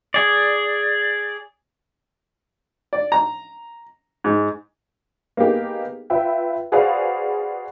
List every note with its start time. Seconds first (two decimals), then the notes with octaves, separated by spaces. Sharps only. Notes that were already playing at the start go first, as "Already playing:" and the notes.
0.14 G#4 D5
2.93 D5
3.12 A#5
4.24 G#2
5.37 A#3 B3 D#4 G4 G#4
6.10 F4 B4 E5 G5
6.72 F#4 G#4 B4 C5 D5 F5